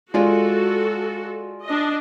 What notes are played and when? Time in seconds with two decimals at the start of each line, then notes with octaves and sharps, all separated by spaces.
0.14 G#3 F4 F#4 A4 D5
1.65 D4 D#5